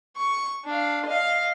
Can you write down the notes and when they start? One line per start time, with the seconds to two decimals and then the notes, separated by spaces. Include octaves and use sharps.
0.17 C#6
0.65 D4 F5
1.06 D#5 F5